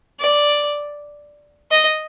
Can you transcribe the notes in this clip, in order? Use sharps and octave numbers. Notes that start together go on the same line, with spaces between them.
D5
D#5